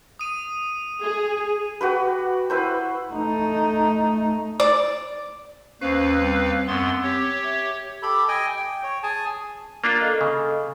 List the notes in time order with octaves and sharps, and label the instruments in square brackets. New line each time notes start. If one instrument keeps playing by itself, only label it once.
[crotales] D#6 D#7
[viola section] G#4
[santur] F#4 G4 B4
E4 B4 C5
[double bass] A3 D#4
[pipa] D5
[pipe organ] D#2 B4 F5 [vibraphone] C#4 C5
[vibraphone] G3 C4
[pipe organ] F#2 B3 C6 [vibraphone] C4 E6
[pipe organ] G4 C#5
[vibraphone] E5
[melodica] G4 A4 B5
D#5 G5 G#5
G5
C#5
G#4 G#5 A5
[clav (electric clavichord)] A#3 D4 F4
[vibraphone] A4 D#5 F5
[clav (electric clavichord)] C#3